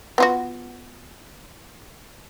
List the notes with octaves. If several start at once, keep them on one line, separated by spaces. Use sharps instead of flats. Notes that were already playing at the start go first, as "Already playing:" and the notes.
B3 F4 F#4